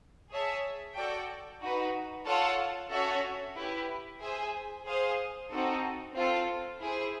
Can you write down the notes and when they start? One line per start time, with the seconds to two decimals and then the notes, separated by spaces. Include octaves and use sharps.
0.30 G#4 C#5 E5 A5
0.95 F#4 A4 D5 G5
1.61 D#4 F#4 B4
2.25 F4 A4 C#5 F#5 A5
2.91 C#4 F#4 A4 C#5 E5
3.56 E4 G4 B4
4.21 G#4 C5 E5 G#5
4.85 G#4 C5 F5
5.50 C4 D#4 F#4 A4
6.15 C4 F4 A4
6.80 E4 G#4 C5